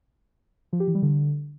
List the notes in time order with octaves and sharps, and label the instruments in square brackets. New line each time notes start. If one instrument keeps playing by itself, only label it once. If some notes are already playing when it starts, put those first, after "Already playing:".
[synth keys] F3
G4
E3
G3
D3